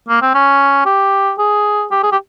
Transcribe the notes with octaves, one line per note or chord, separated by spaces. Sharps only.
A#3
C4
C#4
G4
G#4
G4
G#4
G4